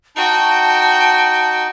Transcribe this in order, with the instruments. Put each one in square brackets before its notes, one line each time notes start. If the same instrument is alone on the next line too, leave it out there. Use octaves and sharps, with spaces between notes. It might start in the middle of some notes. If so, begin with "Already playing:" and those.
[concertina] D#4 [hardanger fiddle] F#4 G5 [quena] A5